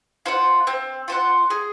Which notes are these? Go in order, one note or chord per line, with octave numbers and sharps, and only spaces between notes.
F4 C5 F#5
C4
F4 C5 F#5
G#4